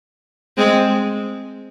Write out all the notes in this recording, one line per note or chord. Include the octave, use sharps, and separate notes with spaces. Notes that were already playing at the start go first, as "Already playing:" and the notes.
G#3 C4